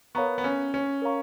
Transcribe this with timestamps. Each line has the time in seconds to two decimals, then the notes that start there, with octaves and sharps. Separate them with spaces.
0.15 B3 A#4 C#5 F5 A#5 C#6
0.38 B3
0.44 C#4
0.74 C#4
1.02 A#4 C#5 F5 A#5 C#6